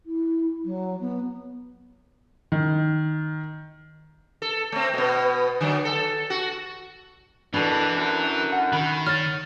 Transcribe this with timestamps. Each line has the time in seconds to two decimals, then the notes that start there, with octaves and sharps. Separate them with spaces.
0.06 E4
0.64 F#3
1.00 B3
2.52 D#3
4.42 A4
4.72 A3 C4
4.94 B2 B3
5.61 D3 F#3
5.85 A4
6.30 F#4
7.54 B2 E3 D4 A4 A#4
7.97 F#2
8.52 F#5
8.73 D#3 B5
9.07 C#5 F#5 F6 A6